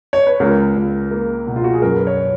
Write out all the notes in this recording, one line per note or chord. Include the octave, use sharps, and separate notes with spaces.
C#5
B4
C#2 A#4
C#2
A#3
B2
F4
F#4
G#4
F#2 A#4
B4
C#5